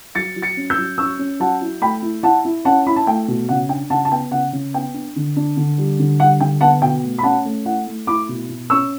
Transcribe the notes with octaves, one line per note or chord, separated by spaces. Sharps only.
F#3 A6 C#7
F#3
A6 C#7
C#4
E6 G6
F#3
C#4 C#6 E6
C#4
F#3 F#5 A5
E4
A3 G5 B5
E4
E4 F#5 A5
E4
C#4 F#5 A5
E4 B5
A5
A3 G5
B2
C#3 F#5
D4 G5
C#3 F#5 A5
A5
B3 G5
C#3 F#5
C#3
B3 G5
D4
D3
D4
D3
G3
D3
G3 F#5
D3 G5
B3 F#5 A5
B2 G5
A3
B5
C#4 F#5 A5
A3
E4 F#5
A3
E4 B5 D6
B2
B2
C#4 C#6 E6